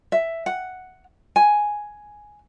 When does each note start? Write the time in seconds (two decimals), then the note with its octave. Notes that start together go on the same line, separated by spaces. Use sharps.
0.12 E5
0.46 F#5
1.36 G#5